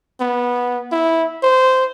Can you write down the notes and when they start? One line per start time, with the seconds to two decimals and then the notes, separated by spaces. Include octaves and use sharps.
0.20 B3
0.92 E4
1.43 C5